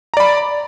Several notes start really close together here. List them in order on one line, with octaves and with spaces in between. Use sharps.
A#5 D5 B5